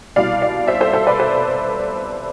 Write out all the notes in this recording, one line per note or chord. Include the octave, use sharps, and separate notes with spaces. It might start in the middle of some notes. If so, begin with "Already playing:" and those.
C2 B2 D5 F5
D5 F5
C5 E5
A4 C5
A4 C5
B4 D5
A4 C5